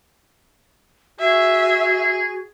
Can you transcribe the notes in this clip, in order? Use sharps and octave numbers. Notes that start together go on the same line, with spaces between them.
F#4 G#4 E5